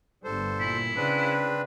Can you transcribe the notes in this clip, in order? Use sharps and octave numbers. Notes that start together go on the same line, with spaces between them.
G1 G2 G3 A4 C5
A#2 E4
C#3 C4 D4 B4